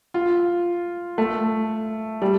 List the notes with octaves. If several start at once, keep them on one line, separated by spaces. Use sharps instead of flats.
F4
A3
G3